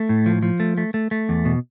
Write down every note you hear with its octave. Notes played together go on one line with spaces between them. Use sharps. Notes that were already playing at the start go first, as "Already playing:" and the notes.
Already playing: A3
A2
F3
F3
A3
A3
A3
A3
E2
B2